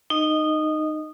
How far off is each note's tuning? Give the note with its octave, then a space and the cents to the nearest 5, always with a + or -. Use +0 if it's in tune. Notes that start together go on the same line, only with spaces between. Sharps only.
D#4 -15 D#5 +0